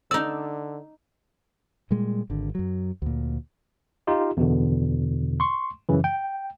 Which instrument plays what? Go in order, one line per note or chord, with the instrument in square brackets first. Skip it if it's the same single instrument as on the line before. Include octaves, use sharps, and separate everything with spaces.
[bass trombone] D3 [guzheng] D#4 D5 [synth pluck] E6
[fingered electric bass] A#2 G3 G#3
G#1 D3
F#2 F#3
D2 A#2
[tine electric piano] D#4 F4 G4
E2 B2 D3
C6 C#6
F#2 C#3 E3
G5